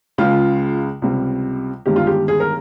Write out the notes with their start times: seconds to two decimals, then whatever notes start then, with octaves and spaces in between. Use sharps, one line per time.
0.18 C#2 C#3 G#3 F4
1.02 C#2 C3 G3
1.86 G1 G2 D#3 G#3 G4
1.96 F4
2.07 G4
2.28 G#4
2.40 A#4